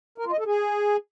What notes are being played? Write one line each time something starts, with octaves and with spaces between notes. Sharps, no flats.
A#4
F4
D#5
A4
G#4